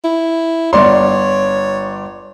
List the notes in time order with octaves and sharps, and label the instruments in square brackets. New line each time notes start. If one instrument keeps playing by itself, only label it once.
[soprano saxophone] E4
[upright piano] G1 D5 C6 [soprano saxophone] C#5